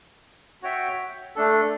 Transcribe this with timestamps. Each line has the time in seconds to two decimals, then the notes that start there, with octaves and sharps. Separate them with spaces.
0.62 F#4 C#5 E5 G5
1.36 A3 D4 A4